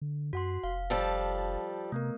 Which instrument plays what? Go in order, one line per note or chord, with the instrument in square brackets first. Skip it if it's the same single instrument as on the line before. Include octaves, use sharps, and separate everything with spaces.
[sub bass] D3
[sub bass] F#2 [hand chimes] F#4 F#5 C6
[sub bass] F1 [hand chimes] F5
[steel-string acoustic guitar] F3 G3 A4
[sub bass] C3 [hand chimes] A3 B3 A#4